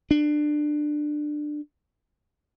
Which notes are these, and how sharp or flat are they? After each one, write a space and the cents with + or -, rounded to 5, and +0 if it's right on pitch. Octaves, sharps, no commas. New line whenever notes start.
D4 +20